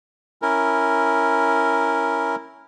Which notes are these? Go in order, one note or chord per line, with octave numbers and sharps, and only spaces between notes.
C#4 E4 A#4